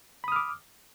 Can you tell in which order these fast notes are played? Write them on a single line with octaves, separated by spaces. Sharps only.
B5 D#6 F6 D6